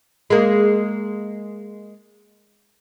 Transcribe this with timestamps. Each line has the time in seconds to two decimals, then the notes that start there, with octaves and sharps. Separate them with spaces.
0.30 G#3 A#3